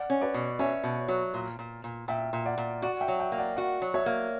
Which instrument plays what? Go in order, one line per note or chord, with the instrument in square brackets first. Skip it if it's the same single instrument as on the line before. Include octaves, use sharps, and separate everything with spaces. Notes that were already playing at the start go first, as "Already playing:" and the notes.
Already playing: [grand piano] D5 F#5
[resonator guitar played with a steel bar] C#4
[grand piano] B4 D5
[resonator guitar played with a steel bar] B2
[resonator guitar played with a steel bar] C#4 [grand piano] C#5 E5
[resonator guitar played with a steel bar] B2
F#3
A#2
A#2
A#2
[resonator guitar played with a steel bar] A#2 [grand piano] E5 G5
[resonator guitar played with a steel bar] A#2
[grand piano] D5 F#5
[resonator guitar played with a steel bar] A#2
[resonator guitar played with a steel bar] F#4 [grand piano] D5 F#5
[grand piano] E5 G5
[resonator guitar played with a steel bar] F#3
[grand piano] E5 G5
[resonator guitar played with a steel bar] A#3
[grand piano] D5 F#5
[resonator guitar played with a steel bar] F#4 [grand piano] D5 F#5
[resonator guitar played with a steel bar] F#3
[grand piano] C#5 E5
[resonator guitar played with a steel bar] A#3